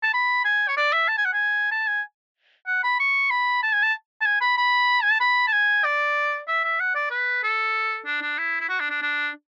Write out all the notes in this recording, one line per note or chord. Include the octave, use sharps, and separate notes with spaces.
A5
B5
G#5
C#5
D5
E5
A5
G#5
F#5
G#5
A5
G#5
F#5
B5
C#6
B5
A5
G#5
A5
A5
G#5
B5
B5
G#5
A5
B5
A5
G#5
D5
E5
E5
F#5
D5
B4
A4
D4
D4
E4
E4
F#4
D4
D4
D4